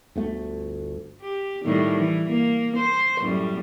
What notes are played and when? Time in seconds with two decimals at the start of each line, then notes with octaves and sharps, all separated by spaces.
0.16 G1 D2 A3
1.22 G4
1.65 A2 D#3 G3
1.98 E3
2.30 A#3
2.76 C5
3.19 F#2 A2 G3